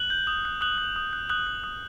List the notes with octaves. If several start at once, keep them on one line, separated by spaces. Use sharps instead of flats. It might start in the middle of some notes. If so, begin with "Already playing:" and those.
Already playing: F#6 F#7
G6
D#6
F#6
D#6 F#6 F#7
F#6
D#6
F#6
D#6 F#6 F#7
F#6
D#6